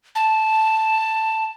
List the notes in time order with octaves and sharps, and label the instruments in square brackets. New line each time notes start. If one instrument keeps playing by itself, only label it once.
[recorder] A5